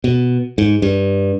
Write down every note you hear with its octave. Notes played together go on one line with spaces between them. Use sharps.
B2
G#2
G2